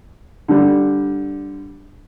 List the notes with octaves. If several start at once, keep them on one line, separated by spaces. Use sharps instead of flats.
D3 G3